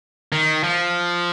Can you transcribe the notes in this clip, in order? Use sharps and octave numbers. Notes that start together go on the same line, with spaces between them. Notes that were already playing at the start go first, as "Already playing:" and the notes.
D#3
F3